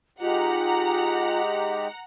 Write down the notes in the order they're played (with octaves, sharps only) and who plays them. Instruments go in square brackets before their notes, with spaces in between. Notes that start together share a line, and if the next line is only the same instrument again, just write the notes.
[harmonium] G#3 D#4 G4 [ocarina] F4 [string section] F#5 A#5